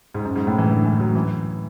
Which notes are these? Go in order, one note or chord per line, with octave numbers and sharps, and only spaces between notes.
G#2
F#2
G#2
A2
E3
D3
E3
F#3
E3